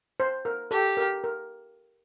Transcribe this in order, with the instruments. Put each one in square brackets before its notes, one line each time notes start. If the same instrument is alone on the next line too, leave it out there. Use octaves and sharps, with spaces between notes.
[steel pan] C5
A#4
[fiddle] G4 [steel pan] A4
[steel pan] A#4
A#4